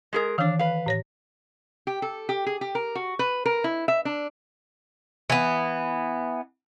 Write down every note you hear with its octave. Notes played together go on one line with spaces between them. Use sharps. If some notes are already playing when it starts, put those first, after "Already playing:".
G#3 G#4 A#4
D#3 E3 D4 F5
B4 F5
A2 C#5 A#6
G4
A4
G4
G#4
G4
A#4
F#4
B4
A#4
E4
E5
D4
E3 B3